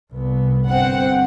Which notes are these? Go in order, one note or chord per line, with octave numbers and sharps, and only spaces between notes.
C2 B3
G1 C4 F#5